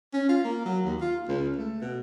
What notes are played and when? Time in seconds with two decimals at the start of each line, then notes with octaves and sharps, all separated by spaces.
0.14 C#4
0.29 F4
0.44 A#3
0.65 F#3
0.85 D#2
1.01 F4
1.28 C#2
1.56 A3
1.81 B2